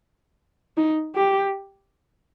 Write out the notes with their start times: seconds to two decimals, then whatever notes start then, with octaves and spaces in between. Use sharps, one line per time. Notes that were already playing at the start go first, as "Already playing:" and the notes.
0.77 D#4
1.16 G4